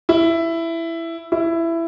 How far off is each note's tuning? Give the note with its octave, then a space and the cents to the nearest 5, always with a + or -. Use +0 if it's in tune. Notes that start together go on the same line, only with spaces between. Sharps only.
E4 +10
E4 +15